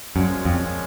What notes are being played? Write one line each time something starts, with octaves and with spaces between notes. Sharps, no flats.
F#2 A#2 F3 G#3 C#4
F2